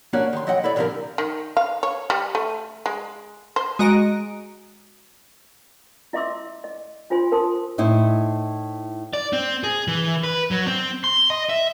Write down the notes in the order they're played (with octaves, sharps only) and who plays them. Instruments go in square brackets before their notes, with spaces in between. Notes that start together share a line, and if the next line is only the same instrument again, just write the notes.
[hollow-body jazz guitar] A#3 C#4 D4 F#4 F#5
D#3 C6
F#3 D#5 F#5 G5
E4 A4 D5
A#2 D3 F3 C4 G4 A#4
[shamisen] D#3
F5
C#5
G3
A3
G#3
C5
[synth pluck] G#3 F#4 D#5 A#5 D7
[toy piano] E4 D#5 E5 C6 D6 E6
D#5
D4 F4 C5 G#5 C6
A#4 C5 A5 C6 D#6
[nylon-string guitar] A2 D#4 E4 C5
[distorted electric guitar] D5
C4
G#4
E3
B4
F#3
C4
C6
D#5
E5